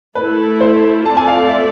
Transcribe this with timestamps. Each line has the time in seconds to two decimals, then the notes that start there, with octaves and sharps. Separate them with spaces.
0.15 A3 E4 A4 B4
0.61 C5
1.04 A3 C4 F4 A4 D5 A5
1.17 G#5
1.28 F5
1.49 E5